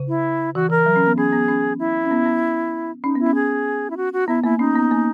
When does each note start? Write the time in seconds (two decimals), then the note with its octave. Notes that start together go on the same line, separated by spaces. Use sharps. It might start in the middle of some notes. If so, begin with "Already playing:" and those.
Already playing: C#3
0.08 E4
0.55 E3 F#4
0.70 E3 A#4
0.86 F#3
0.96 C#4
1.07 B3
1.17 C#4 G#4
1.33 B3
1.48 C#4
1.79 E4
2.05 C#4
2.11 B3
2.26 B3
3.04 C#4 D#4
3.15 B3 E4
3.26 C#4
3.35 G#4
3.90 E4
3.97 F#4
4.13 F#4
4.28 B3 E4
4.44 A#3 E4
4.59 C#4 D#4
4.75 B3
4.91 A#3